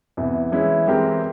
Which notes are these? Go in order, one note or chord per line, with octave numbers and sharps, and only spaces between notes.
E2 C3 E3
E3 G#3 C#4 E4
E3 G#3 C4 G4 A#4